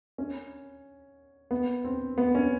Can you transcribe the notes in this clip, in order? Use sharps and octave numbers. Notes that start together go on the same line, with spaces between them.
C#4
B3
C4
B3
C#4